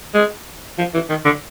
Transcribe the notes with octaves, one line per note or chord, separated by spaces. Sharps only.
G#3
F3
E3
D#3
D3